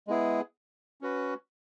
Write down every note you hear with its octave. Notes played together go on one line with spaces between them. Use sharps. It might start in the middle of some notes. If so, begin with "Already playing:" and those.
G#3 B3 E4 G#4
C#4 F#4 B4